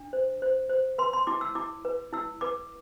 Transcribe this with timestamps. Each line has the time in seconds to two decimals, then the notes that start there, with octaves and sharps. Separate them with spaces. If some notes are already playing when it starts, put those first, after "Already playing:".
Already playing: D4
0.13 C5
0.42 C5
0.70 C5
0.98 B4 C6
1.13 C6
1.27 E4 D6
1.41 E6
1.55 E4 D6
1.85 B4
2.13 E4 E6
2.41 B4 D6